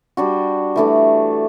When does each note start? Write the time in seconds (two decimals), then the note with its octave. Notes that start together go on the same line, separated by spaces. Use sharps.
0.17 G3 D4 F#4
0.76 E3 A3 D4 F#4